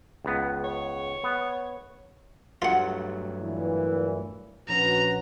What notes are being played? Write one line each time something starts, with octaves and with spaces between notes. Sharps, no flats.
C#2 B3
C#5
B3
G2 F#3 A3 F4 F#5
A#2 E3
A#1 C#4 F#4 B4 A#5